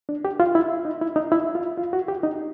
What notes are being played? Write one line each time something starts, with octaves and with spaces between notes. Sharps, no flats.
D4
G4
F4
E4
D#4
E4
D#4
E4
F4
F4
F#4
G4
D#4